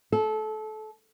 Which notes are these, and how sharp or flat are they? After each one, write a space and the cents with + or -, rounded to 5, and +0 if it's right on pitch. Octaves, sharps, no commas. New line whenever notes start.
A4 -25